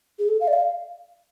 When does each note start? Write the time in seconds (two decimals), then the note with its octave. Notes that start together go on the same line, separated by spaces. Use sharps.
0.19 G#4
0.28 A4
0.41 F5
0.48 D5
0.53 F5